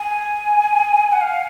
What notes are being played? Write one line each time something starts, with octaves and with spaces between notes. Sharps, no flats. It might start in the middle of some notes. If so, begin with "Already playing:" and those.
Already playing: G#5
F#5
F5